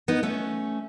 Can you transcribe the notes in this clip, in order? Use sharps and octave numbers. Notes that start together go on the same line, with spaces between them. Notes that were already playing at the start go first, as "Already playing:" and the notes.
B3 D#4
A3 C#4